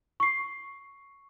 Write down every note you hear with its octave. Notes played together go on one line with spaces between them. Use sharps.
C#6 C7